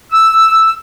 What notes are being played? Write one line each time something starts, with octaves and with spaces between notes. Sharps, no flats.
E6